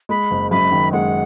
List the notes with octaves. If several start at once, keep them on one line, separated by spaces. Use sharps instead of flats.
G#3 B5
F#1
F#2 B5
D#3
G#3 F#5